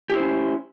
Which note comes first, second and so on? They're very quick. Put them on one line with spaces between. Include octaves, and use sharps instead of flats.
G4 E4 C5 C#4